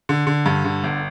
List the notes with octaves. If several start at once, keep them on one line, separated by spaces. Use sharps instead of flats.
D3
D3
G2
D3
G1